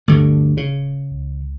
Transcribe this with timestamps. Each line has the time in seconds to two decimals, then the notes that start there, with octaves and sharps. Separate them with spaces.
0.08 D1 D2 G2 D3
0.57 C#3
1.11 C#2